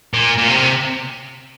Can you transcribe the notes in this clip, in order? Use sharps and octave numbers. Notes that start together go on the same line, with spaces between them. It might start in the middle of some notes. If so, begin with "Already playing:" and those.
A#2
A#2
C3